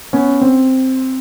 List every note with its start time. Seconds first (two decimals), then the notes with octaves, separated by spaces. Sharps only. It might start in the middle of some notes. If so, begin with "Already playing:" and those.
0.13 B3 C#4
0.41 C4